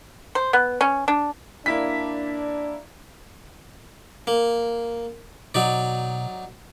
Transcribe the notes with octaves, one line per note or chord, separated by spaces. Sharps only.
C5
B3
C#4
D4
A#3 D4 E4 B6
A#3
B2 F#3 D#4 D5